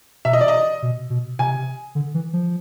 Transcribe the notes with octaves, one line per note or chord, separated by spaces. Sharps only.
B2 E5
D#5
D5
D#5
B2
B2
C3 G#5
D3
E3
F3